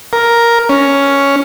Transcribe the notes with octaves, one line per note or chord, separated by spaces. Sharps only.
A#4
C#4